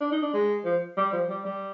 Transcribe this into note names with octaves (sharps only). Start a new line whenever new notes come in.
D4
D#4
D4
G#3
F3
G3
F3
G3
G3